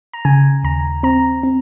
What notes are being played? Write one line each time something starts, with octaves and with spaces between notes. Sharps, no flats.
A#5
C#3 G#5
D#2 A#5
C4 A#5
C4